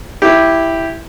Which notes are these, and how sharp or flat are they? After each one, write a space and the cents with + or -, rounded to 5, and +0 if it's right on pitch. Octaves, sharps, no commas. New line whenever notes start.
E4 +0 G4 +0